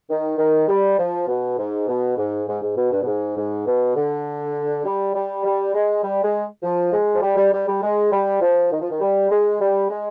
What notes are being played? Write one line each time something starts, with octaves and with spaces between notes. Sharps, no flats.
D#3
D#3
G3
F3
B2
G#2
B2
G#2
G#2
G#2
B2
G2
B2
G#2
G#2
B2
D3
G3
G3
G3
G#3
G3
G#3
F3
G#3
F3
G3
G3
G3
G3
G#3
G3
F3
D#3
F3
D#3
G3
G#3
G3
G#3